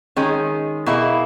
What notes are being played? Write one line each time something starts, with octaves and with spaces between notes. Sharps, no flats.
D#3 G#3 C#4 G#4
B2 A#3 E4 G#4